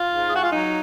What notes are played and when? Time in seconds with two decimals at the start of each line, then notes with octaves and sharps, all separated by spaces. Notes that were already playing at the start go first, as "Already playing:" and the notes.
Already playing: F4
0.09 G#2
0.28 G#3 G#4
0.36 F#4
0.44 F4
0.53 F#3 D#4